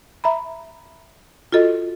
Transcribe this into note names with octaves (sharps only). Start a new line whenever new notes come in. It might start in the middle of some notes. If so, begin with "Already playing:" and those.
E5 A#5 B5
F4 F#4 A4 D#5